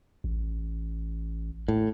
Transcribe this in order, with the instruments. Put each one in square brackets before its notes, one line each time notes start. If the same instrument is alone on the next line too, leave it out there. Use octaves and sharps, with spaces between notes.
[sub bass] A1
[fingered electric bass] A2